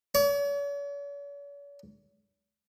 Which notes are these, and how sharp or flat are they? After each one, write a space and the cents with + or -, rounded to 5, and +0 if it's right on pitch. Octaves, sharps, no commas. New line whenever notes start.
C#5 +45